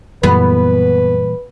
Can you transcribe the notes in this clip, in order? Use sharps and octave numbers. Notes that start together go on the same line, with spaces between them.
F#2 A#2 E3 G3 B3 B4